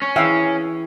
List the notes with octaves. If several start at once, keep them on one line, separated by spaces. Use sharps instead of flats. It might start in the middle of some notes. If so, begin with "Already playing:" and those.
C#4
E3 G#4 E5 F5 G5